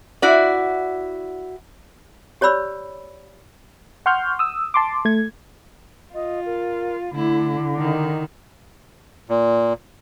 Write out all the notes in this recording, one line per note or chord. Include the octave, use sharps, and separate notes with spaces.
E4 F#4 D5
G4 C#5 D5 B5 E6
F#5 C6 C#6 F6 G6
D#6 E6
A5 C6 D6
A3 G#6
F4 D#5
A#4
D3 A3 E4
D#3 D#4
A#2